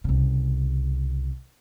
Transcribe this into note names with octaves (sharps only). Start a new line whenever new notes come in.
C2 C#3